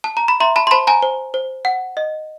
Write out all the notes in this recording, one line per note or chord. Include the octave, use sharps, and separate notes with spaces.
A5
A#5
B5
E5 A#5 C6
A5 B5
C6
C5 A5 B5
G#5 A#5
C5
C5
F#5
D#5